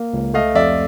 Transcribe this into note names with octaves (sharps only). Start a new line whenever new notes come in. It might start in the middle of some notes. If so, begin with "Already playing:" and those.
Already playing: A#3
C#2
A3 D#5 F5
F2 D5 E5